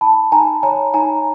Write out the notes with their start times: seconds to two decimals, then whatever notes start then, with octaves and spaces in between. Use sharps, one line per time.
0.01 D#4 A5 B5
0.32 D#4 G#5 A#5
0.63 C#5 G#5 A#5
0.94 D#4 G#5 A#5